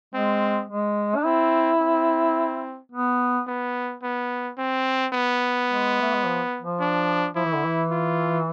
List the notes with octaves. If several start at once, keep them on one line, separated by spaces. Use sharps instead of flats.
G#3 C4
G#3
D4
C4 E4
C4
B3
B3
B3
C4
B3
G#3
A3
G#3
F3
F3
D4
F3 E4
E3
D3
E3
F4